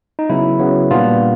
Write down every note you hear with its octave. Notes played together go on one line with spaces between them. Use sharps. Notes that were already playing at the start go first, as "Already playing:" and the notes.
D#4
C#3 F#3 B3 E4
C#3 F#3 B3
A#2 G3 B3 D4 F4